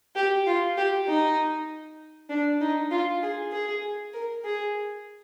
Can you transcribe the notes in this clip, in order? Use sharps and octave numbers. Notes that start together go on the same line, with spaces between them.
G4
F4
G4
D#4
D4
D#4
F4
G#4
G#4
A#4
G#4